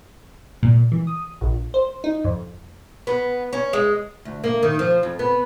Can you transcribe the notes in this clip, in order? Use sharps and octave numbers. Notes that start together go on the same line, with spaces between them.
A#2
E3
D#6
A#1
C5
D#4
F2
B3
C#4
G#3
D2
A#3
D#3
F3
F2
B3